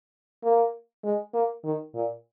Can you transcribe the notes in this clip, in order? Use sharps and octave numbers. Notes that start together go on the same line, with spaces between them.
A#3
G#3
A#3
D#3
A#2